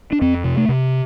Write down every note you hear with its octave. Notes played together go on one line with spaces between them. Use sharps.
D4
F2 C4
C3
A3
C3